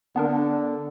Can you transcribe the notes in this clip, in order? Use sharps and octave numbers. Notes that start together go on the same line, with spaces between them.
D3 B3 D4 A#4